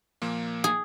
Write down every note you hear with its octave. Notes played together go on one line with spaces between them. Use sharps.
A#2 F3 A#3
G#4